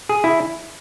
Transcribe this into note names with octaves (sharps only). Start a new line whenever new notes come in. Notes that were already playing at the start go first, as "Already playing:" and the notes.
G#4
E4